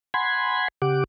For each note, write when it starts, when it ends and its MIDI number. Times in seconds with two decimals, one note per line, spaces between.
0.14 0.68 78
0.14 0.68 80
0.14 0.68 83
0.14 0.68 84
0.14 0.68 92
0.82 1.04 49
0.82 1.04 67
0.82 1.04 78
0.82 1.04 86